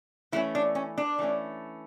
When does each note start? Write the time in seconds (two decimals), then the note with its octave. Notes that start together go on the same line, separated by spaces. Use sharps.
0.32 E3 A3 C#4 E4
0.55 D4
0.75 C#4
0.98 D4
1.19 E3 A3 C#4